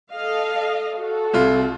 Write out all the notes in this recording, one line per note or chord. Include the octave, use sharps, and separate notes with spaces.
A4 D#5 F5
F#4 A4
C2 F4